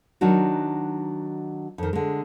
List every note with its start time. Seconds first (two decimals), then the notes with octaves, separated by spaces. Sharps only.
0.21 D#3 F#3 D4 D#4 F#4
1.78 F2 D#3
1.93 D3 G#3